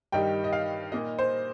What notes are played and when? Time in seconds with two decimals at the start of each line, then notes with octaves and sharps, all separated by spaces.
0.12 G2 D#3 G3 D#4 G5
0.44 D#5
0.53 F5
0.92 A#2 A#3 D#4 D#5
1.19 C5